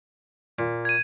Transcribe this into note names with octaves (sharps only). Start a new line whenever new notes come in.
A#2
G#6 D#7